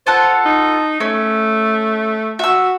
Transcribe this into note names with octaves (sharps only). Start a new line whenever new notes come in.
F4 A4 C5 F#5
D#4
A3 C#4
F#4 E5 E6